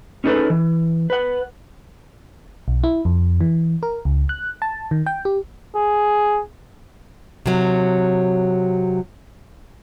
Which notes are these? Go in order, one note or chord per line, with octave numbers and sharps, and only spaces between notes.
C#4 D#4 G#4 A4 B4
E3
B4 F#5
B1
E4
F2
E3
A#4
C#2
F#6
A5
D#3
G5
G4
G#4
C3 F#3